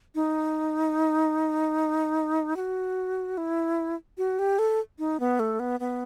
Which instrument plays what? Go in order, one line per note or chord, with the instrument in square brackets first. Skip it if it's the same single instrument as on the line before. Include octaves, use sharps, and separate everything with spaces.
[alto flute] D#4
F#4
E4
F#4
G4
A4
D#4
B3
A3
B3
B3